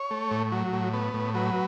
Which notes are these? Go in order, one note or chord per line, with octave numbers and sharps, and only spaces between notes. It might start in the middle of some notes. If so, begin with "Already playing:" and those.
Already playing: C#5
A3
A2
F#3
A2
B3
A2
F#3 B4